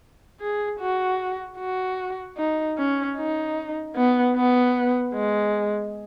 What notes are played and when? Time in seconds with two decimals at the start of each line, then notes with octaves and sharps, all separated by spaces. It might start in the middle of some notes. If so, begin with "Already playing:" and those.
0.41 G#4
0.80 F#4
1.59 F#4
2.37 D#4
2.78 C#4
3.17 D#4
3.96 B3
4.36 B3
5.14 G#3